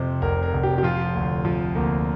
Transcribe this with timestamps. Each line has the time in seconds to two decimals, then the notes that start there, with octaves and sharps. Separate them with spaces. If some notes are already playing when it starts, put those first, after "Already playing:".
Already playing: F2 C3 C5
0.22 F1 A#4
0.43 A#4
0.54 F1
0.63 G4
0.78 G4
0.83 F3 F4
1.15 D2
1.45 F3
1.75 D2 A#3